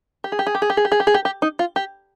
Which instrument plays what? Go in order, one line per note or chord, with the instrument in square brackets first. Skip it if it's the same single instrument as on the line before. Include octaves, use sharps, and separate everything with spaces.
[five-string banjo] G4
G#4
G4
G#4
G4
G#4
G4
G#4
G4
G#4
G4
G#4
G4
G4
D#4
F4
G4